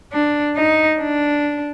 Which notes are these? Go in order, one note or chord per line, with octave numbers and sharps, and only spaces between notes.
D4
D#4
D4